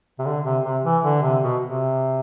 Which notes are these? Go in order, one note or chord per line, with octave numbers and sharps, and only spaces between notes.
C3
D3
C3
C3
E3
D3
C3
B2
C3